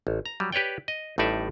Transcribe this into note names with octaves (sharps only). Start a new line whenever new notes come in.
A1
A#5
F#3 G3
G4 B4 C#5 D5 G5
D#5
A1 A2 G3 D#4 D5 E5